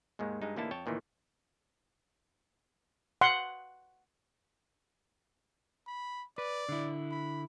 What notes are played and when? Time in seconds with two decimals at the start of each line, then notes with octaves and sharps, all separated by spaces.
0.19 D#2 G#2 D#3 G#3
0.42 G2 G#3 D#4
0.56 A1 D3 A#3 D#4 E4 A5
0.71 F2 C#5 G5 A5
0.86 D2 A#2 D#3 E3
3.21 F#5 C6
5.87 B5
6.38 B4 D5
6.69 D3 E4
7.11 B5